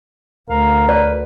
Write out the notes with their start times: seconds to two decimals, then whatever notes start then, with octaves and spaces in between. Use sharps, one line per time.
0.50 D2 A#4 F5
0.89 B4 D5